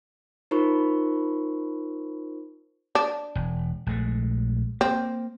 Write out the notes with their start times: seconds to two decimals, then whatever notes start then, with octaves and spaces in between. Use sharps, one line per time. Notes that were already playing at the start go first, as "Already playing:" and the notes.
0.51 D#4 F4 A#4 C5 B5 C#6
2.95 D4
3.35 E1
3.87 A#1 G#3 A3
4.81 A#3 C4